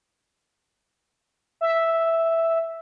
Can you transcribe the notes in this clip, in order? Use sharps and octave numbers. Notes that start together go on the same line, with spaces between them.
E5